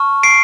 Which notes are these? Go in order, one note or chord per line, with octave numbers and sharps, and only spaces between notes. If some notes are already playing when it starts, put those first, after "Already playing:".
Already playing: A5 C#6 F6
C7 D7